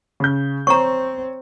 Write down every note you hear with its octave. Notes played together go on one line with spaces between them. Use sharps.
C#3 G6
C4 C#5 A#5 C#6